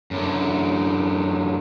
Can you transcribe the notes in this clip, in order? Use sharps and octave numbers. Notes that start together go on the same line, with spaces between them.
F#2 D3